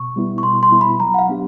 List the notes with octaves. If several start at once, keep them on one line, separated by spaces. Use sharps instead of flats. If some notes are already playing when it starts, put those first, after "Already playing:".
Already playing: B2 C#6
G3 B3 E4
C#6
B2 C6
C6
G3 B3 E4
B5
F#3 A#5
F#5
F5
B3 D4 G4